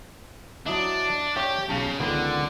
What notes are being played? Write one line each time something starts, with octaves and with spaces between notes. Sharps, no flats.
F#3 D4 E4 D#5
G4 C#5 D5 E5
B1 C#3 A5
C#2 D3 D#3 B3